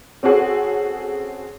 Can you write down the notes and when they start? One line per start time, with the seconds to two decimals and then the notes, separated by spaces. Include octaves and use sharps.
0.23 C4 C#4 F#4 G#4 A4